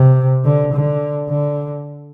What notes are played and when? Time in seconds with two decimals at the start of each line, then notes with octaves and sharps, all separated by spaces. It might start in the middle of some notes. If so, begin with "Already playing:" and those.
Already playing: C3
0.44 D3
0.72 D3
1.29 D3